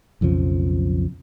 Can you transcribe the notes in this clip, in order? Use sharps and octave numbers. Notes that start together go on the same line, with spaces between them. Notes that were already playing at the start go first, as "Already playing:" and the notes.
B1 F2 C#3 F3